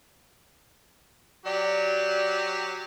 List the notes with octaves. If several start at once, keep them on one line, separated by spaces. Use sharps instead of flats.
F#3 G4 D5